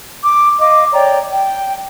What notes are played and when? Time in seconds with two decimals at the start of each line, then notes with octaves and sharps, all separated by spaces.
0.22 D6
0.59 D#5 F5 D6
0.92 C#5 D5 G5 A#5
1.30 G5